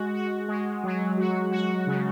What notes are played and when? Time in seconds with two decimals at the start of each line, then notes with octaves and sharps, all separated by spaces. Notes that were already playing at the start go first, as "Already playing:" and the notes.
Already playing: G#3 F#4
0.14 F#4
0.48 G#3
0.84 F#3
1.18 F#4
1.52 F#4
1.87 C#3